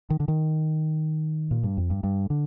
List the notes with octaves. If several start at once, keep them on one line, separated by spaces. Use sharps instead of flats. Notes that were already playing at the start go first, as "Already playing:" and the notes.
D#3
D3
D#3
A#2
G2
F2
G2
G2
D3